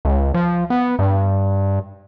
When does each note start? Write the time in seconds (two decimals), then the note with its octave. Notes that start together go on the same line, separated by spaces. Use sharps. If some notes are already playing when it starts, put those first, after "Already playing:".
0.05 C#2
0.34 F3
0.70 B3
0.99 G2